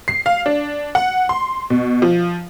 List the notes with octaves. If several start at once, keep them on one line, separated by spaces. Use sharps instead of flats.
C7
F5
D4
F#5
C6
B2
F3